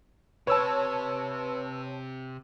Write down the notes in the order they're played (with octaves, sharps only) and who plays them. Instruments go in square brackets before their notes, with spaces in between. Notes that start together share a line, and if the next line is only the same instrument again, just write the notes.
[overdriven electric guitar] C3 [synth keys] B4 E6 [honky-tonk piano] C#5 A5